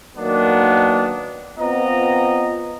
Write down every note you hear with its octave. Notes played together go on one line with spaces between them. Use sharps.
D#3 F#3 A#3 B3 D4
B3 C4 F4 D#5 A#5